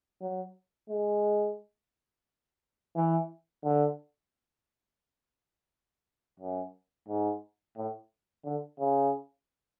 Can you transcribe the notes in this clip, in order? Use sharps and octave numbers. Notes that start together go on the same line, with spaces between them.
F#3
G#3
E3
D3
F#2
G#2
A2
D3
C#3